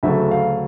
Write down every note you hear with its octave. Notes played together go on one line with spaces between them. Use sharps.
D2 C#3 F#3 A3 E5
F5